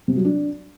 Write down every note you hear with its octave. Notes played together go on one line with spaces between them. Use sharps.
C3
F#3
D4